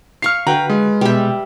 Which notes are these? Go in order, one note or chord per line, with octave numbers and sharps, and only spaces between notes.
F5 C#6 F6 C7
D3 F#4 B4 G5 A#5
G#3
B2 G3 E5 G5